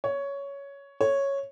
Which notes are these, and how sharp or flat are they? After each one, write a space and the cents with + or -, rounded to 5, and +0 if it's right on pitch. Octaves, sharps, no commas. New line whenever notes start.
C#5 +10
C#5 -5